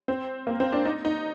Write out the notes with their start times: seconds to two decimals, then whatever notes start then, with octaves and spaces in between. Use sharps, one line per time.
0.08 C4
0.47 A#3
0.60 C4
0.72 D4
0.85 D#4
1.05 D#4